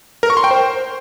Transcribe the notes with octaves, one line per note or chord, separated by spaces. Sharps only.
A#4
C#6
C6
G5
C5